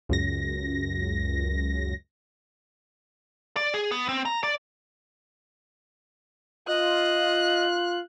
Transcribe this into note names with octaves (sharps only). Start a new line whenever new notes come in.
C#2 F#2 A#6
D5
G#4
B3
C4
A#5
D5
F4 D#5 F#6